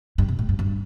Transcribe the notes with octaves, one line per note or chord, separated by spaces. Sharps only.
G2
B2
A2
G2
G2